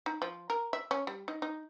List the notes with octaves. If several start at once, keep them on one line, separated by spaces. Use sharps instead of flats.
D#4
F3
A#4
E5
C#4
G3
D#4
D#4